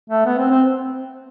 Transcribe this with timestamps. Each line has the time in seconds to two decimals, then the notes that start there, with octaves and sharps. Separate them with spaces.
0.10 A3
0.25 B3
0.38 C4
0.50 C4